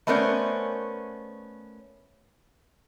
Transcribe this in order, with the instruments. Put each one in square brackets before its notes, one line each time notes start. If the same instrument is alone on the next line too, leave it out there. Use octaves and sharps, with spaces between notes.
[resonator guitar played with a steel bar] A3 B3 C#4 A#4 C5 D5